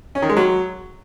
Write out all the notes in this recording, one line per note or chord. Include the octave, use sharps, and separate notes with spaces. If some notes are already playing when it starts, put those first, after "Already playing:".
C#4
D#3
G#3
F#3